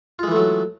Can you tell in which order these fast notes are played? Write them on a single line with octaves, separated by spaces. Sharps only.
F4 G#3 E3 A3 F#3